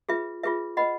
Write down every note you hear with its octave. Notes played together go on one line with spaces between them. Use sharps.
F4 G#4 B4 E5
F4 G#4 B4 E5
B4 D#5 F#5 B5